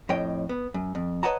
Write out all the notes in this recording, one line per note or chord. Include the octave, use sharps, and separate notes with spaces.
F2 A2 C#5 D#5 G5
B3
F#2
F2
B4 C#5 D#5 F#5 A5 A#5